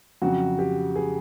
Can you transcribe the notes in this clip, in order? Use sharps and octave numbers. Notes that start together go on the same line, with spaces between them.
F2 C#3 F#3 F#4
G4
G#4